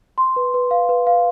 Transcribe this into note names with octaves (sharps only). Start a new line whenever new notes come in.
C6
B4
B4
F5
B4
F5